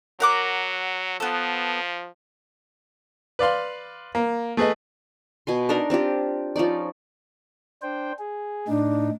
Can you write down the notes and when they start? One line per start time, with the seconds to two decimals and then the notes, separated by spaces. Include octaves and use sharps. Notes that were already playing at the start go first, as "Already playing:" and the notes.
0.20 F#3 A#4 F#5 D6
1.20 F3 B3 A4
3.39 B4 D5 F5 C6
4.15 A#3
4.57 A3 G#4 B4 D#5
5.47 B2 G#5 C6
5.69 D4 D#4 A#4 D#5
5.90 C4 D4 F4 G4
6.56 F3 C#4 D#4 D5
7.82 D4 C5 G5
8.19 G#4
8.68 A2 D4 D#4